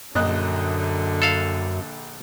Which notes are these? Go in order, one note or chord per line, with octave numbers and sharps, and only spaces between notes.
A#1 F#2 D3 D#5 F#6
A4 F5